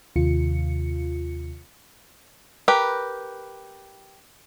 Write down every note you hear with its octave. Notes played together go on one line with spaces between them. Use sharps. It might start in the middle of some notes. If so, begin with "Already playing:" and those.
D#2 C3 F4 C#7
G4 A#4 B4